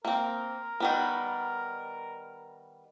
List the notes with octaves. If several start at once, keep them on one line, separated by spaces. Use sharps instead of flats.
A#3 C4 A#4
D#3 G3 B3